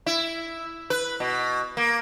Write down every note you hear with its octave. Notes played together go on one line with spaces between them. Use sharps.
E4
B4
B2
A#3